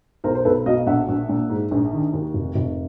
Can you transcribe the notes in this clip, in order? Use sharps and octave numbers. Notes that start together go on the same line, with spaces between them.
B1 A#4 C5
C5
B1 A4 B4
B2 D#5 F5
A#1 E5 F#5
A#1
A#2
G#2
A#1
D#3
D#2
F1
F1